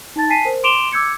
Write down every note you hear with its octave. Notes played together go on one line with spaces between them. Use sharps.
D#4 A5 A6
G#5 A5 B6 C7 D#7
A#4 C5
C6 D6 D7 E7 F7 G7
D6 E6 G6 G#6 C#7